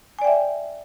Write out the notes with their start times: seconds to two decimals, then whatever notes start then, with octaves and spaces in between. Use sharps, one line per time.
0.19 G#5
0.21 D5
0.24 G5
0.27 E5